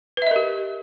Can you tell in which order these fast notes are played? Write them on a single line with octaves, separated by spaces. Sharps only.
B4 E5 D#5 A#4 G4